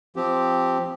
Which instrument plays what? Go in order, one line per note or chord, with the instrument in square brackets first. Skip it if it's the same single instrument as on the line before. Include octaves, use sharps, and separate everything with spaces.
[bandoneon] F3 C4 G4